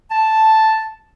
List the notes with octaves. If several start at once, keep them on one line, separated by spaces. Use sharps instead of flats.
A5